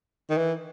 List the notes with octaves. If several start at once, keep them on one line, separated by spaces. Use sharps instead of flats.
D#3
E3